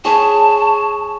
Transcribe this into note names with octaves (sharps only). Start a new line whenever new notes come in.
G#4 C#5 A5